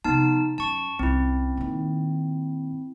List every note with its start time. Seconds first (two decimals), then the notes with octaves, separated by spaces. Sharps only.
0.04 C3 F3 B3 D#4 A5
0.58 F#2 A5 C#6
0.99 C2 C4 C#4 E4
1.57 A#2 D#3